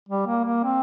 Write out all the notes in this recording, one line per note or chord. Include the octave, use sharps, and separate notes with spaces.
G3
A#3
A#3
C4